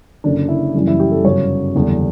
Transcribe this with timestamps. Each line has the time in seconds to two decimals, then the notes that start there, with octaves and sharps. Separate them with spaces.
0.24 F#1 F#2 D3 D4
0.49 E4
0.74 F#1 F#2 E3 G3
0.87 E4
1.00 G4
1.11 A4
1.24 G1 F#2 C#3 F#3 C#5
1.74 F#1 E2 D3 G3